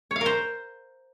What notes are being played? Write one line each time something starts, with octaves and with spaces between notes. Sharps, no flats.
C#5
F5
A#4
C5